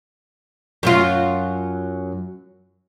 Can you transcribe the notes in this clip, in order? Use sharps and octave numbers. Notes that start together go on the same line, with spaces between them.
F#2 F#3 F4